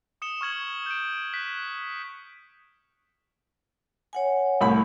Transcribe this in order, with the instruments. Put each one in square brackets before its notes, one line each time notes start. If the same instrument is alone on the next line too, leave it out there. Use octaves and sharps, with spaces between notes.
[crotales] D#6 C#7 E7 G7
C#6 F6 G#6 F#7
G6 D7
F#6 B6
[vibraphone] C#5 F#5 G#5
[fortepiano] C2 A2 B5